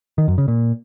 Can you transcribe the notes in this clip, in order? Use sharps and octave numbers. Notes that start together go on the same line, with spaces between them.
D#3
F#2
C#3
A#2